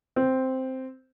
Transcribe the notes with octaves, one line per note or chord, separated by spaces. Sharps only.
C4